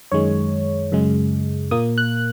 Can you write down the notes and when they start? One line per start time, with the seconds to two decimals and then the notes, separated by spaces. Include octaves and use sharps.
0.12 F#2 D#3 G#3 C#5
0.92 F#2 C#3 G#3
1.71 A#2 A#3 D#6
1.98 F#6